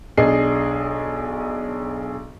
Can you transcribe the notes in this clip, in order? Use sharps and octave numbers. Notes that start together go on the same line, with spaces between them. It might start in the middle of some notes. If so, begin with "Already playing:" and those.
B1 D4 G#4 D#5 C7